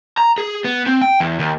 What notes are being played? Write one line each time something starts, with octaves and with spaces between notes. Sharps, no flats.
A#5
G#4
B3
C4
G5
E2
D#2